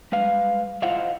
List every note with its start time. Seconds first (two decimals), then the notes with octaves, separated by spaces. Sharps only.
0.12 G3 G#3 B4 F5
0.82 E4 F4 C5 D#5 F5 F#5